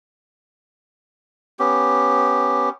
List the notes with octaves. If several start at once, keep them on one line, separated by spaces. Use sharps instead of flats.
B3 C#4 G4